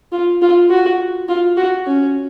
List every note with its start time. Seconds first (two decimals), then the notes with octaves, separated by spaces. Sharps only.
0.12 F4
0.42 F4
0.70 F#4
1.29 F4
1.57 F#4
1.86 C#4